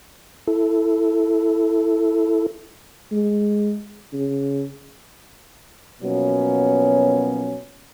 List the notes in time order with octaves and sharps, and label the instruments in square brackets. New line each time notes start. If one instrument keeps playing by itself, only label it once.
[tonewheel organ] E4 A4
[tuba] G#3
C#3
[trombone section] B2 F3 F#3 A#3 B3 C#4